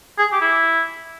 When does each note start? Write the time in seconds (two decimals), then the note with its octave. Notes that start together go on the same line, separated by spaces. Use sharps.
0.18 G#4
0.32 G4
0.41 E4